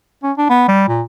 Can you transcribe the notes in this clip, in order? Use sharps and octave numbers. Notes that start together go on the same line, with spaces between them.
C#4
D4
B3
G3
A#2